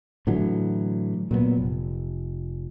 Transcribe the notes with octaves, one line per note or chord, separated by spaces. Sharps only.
A2 D3 E3 F#3
A#2 F#3 A#3 B3
F1